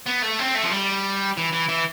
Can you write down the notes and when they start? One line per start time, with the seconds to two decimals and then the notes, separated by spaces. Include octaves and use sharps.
0.06 B3
0.22 A3
0.39 C4
0.55 A3
0.63 F3
0.71 G3
1.37 E3
1.52 E3
1.69 E3